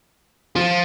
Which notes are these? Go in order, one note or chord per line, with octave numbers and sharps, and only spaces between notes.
F3